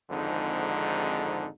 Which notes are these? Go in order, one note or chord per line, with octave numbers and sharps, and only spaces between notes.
G#1 F2 G#2 D3 D#4